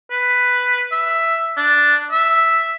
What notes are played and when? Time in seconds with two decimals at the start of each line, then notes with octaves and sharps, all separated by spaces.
0.11 B4
0.92 E5
1.57 D4
2.11 E5